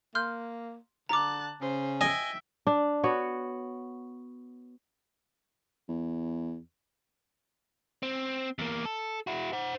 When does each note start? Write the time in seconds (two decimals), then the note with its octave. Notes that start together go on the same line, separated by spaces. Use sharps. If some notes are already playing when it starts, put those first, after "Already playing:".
0.15 A#3 C6 F6 G6
1.09 D3 A5 A#5 D6 F#6
1.61 C#3 C5
2.01 D#5 E5 G5 G#5
2.67 D4
3.03 B3 F#4 C#5
5.89 E2
8.03 C4
8.59 E2 A#3
8.85 A4
9.27 E4 F#4
9.53 C5 F#5